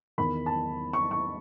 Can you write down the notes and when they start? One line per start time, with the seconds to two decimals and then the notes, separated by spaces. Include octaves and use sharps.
0.18 E2 D#3 B5
0.46 A5
0.93 C#6
1.11 C#6